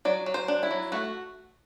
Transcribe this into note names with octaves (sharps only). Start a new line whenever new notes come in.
F#3 D5
F#3
C5
D4
E4
F#3
A3 F#4